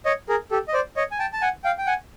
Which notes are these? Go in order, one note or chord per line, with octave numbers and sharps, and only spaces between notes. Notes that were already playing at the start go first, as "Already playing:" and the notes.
C#5 D#5
G#4 A#4
G4 A4
D#5
C5 D5
C#5 D#5
G#5
G5 A5
A5
F#5 G#5
F5 G5
G5
F#5 G#5